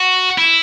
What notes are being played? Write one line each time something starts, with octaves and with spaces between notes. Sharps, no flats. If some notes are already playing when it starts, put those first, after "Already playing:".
Already playing: F#4
E4